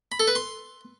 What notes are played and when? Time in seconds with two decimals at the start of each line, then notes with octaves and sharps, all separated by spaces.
0.12 B5
0.20 A4
0.27 B4
0.35 C6